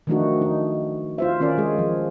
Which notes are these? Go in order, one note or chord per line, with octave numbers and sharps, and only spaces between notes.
D#3 F3 A3 D4 D#4 F#4
D#4
F4 C5 E5
D#3 C#4 F4 A#4 D5
G#3 G#4
F3